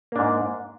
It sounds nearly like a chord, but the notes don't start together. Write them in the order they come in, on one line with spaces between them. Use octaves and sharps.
A#3 D4 G#2